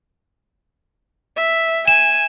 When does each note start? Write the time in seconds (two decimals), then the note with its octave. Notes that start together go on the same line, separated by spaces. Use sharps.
1.36 E5
1.88 G#5 E7